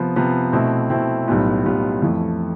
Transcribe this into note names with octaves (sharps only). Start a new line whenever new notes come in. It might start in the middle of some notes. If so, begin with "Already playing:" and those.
Already playing: C3 F3 B3
C3 F3 B3
B2 A3 C4 E4
B2 A3 C4 E4
B1 A2 G3 B3 F4
B1 A2 G3 B3 F4
F2 E3 A3